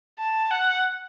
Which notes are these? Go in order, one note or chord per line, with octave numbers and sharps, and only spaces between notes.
A5
F#5